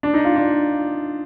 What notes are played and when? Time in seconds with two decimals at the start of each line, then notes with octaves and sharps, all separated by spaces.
0.03 D4
0.14 D#4
0.25 F4
0.36 D4